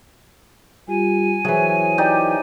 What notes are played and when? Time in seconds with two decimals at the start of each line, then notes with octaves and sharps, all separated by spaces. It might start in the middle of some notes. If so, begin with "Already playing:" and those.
0.87 G3 F4 G4 G#5
1.45 E3 F#3 G#4 C5 C#5 E5
1.98 D#4 G4 D5